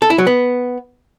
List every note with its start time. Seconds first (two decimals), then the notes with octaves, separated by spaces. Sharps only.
0.02 A4
0.10 E4
0.18 F#3
0.27 B3